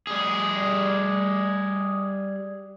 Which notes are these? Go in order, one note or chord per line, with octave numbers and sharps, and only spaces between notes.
G3 G#4